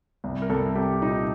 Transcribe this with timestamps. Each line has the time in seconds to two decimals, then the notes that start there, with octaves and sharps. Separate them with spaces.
0.24 C2
0.42 A#4
0.50 C2 A4
0.75 C2 G4
1.01 A#2 D#4